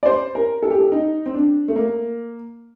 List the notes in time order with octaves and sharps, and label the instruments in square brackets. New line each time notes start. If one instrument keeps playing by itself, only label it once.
[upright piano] D5
C5
A#4
A4
G4
A4
D#4
C4
D4
A3
A#3